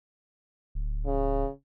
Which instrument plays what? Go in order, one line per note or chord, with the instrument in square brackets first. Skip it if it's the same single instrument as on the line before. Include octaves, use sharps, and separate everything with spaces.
[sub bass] D1
[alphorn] C#3